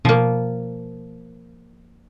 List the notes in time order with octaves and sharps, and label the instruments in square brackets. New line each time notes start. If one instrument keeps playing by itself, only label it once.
[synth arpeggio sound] B2 [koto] F3 A#3